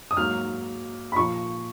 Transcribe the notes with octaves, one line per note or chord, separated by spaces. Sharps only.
D#6
G#2 F#3 A#3 F6
B5
A#2 F3 A#3 C#6